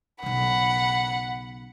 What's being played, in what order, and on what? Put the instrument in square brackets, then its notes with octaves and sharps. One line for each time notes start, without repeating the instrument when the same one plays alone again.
[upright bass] B1 C#3 [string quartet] F#5 B5